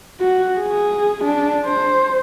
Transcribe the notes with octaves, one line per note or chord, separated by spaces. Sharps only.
F#4
G#4
D4
C5